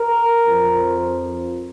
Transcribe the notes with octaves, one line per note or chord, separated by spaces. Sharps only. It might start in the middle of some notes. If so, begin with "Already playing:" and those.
Already playing: A#4
F2 F3